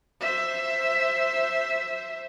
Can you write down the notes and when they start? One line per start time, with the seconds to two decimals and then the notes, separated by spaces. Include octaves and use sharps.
0.20 C5 E5